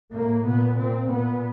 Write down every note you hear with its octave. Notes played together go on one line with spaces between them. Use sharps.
A2 A#3
A#2 B3
A#2 C4
A#2 B3